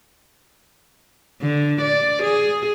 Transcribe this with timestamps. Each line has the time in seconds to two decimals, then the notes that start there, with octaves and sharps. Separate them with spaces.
1.42 D3
1.82 D5
2.23 G#4